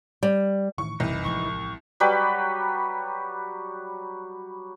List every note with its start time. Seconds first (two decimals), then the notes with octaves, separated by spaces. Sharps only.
0.23 G3
0.78 A2 D#3 E3 C#6
1.00 F#1 C2 E3 D#4
1.24 A1 F3 G#3 C#6
2.00 F#3 G3 G4 B4